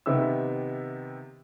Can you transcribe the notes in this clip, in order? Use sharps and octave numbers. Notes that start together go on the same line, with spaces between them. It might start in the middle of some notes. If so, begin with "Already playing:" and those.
C3 D#3 B3 G4 E5 E6